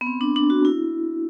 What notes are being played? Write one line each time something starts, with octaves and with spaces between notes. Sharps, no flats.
B3
C4
D4
D4
F#4
E4